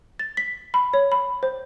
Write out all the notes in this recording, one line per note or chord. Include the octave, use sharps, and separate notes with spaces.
A6
B6
B5
C#5
B5
C5